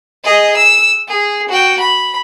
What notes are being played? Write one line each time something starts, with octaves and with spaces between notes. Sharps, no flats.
G#4 D#5
E6
G#4
F#4 G5
B5